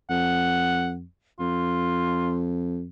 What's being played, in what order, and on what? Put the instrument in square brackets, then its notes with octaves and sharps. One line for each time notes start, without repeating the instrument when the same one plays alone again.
[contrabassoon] F2 [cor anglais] F#5
[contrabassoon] F2 [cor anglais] F4